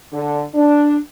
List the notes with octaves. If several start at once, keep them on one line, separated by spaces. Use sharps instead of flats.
D3
D4